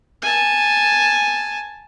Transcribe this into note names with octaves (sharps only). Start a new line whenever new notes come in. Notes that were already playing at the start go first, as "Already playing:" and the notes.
G#5 A5